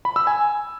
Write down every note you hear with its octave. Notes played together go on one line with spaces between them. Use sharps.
B5
E6
G#5